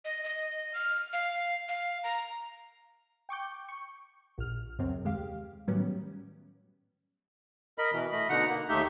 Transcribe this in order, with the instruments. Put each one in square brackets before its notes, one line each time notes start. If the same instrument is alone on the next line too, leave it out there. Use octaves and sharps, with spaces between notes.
[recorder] D#5
D#5
F6
F5
F5
A#5
[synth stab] G5 C#6 D6 G6
C#6
A#1 F6
C#2 F#2 C3 C4
D#2 G#3 G4 F5
A2 D#3 F#3 G3 B3 C#4
[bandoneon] A#4 D#5 B5
B2 E3
A3 D#5 B5
B2 D3 D#4 F#5 A#5
A#3
D#2 A3 D#4 G4 E5 G6